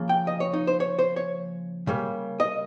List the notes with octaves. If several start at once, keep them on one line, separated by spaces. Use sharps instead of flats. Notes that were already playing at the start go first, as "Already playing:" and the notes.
Already playing: C#3 F3 A#3
G5
D#5
C#5
D#4
C5
C#5
C5
C#5
C#3 G3 A#3
D#5